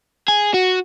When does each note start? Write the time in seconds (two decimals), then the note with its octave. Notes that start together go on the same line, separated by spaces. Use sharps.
0.28 G#4
0.54 F#4